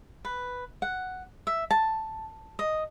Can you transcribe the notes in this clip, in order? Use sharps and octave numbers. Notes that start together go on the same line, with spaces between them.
B4
F#5
E5
A5
D#5